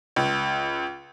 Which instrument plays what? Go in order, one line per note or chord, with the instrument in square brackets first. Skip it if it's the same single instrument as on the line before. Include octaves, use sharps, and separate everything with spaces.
[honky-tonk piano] C#2